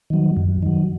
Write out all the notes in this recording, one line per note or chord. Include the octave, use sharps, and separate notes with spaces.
D#3 F#3
F#2
D#3 F#3